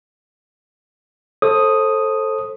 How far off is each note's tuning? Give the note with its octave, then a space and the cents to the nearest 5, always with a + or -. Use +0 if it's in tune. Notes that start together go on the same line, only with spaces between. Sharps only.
A4 +0 C5 +30 D#6 +0